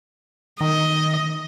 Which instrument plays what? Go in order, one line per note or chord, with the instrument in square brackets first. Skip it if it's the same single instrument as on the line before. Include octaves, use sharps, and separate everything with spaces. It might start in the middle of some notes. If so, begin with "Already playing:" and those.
[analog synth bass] D#3 [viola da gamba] D#5